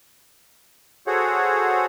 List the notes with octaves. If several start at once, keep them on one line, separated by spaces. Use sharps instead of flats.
F#4 G#4 A4 C5 C#5 F#5